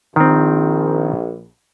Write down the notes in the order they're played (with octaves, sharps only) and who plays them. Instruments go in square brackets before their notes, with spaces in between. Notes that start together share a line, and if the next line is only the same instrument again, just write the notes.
[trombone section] A#1 [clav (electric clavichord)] D#3 C4